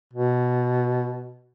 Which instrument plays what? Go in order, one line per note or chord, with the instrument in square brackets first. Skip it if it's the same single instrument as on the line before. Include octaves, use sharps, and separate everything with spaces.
[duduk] B2